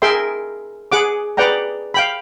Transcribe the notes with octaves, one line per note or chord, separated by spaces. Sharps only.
G#4 A#4 E5 G5 C6
G#4 F#5 D6
G#4 B4 D5 F#5 G5 A#5
F5 G5 B5